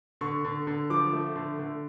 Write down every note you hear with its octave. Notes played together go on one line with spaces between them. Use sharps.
D3 C#6
D3
D3
F3 D6
A3
D3
D3